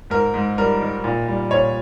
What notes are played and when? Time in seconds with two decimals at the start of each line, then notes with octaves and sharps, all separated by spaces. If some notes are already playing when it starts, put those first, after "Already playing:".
0.10 G#2 A#4
0.34 G#2
0.58 G3 A#4
0.81 D#3
1.04 A#2
1.28 G3
1.51 A#2 C#5